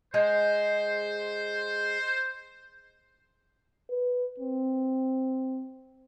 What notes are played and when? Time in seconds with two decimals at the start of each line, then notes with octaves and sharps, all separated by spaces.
0.14 G#3 C5
3.90 B4
4.40 C4